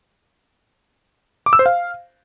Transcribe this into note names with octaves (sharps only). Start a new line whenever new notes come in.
D6
E6
C5
F5